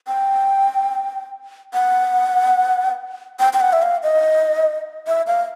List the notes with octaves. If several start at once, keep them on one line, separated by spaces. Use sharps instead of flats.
G5
F#5
G5
G5
F#5
E5
F5
D#5
E5
F5